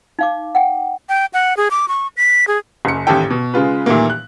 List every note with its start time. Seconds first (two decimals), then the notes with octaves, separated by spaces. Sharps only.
0.19 D#4 F5 D6
0.55 F#5 G5
1.09 G5
1.34 F#5
1.57 G#4
1.71 D6
1.88 C#6
2.17 B6
2.48 G#4
2.85 F#1 F#2 C#7
3.07 A1 D#2 G#2 G4 A4 G5
3.30 B2
3.54 C#3 G#3 F4 B4
3.86 A#2 D#3 E3 G3 A3 A#3
4.10 F#6